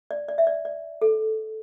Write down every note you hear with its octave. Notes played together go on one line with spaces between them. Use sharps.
D5
D5
E5
D5
D5
A4